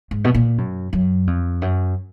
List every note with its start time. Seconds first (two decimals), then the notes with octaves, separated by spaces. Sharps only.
0.11 G#2
0.24 B2
0.34 A#2
0.58 F#2
0.93 F#2
1.27 F2
1.62 F#2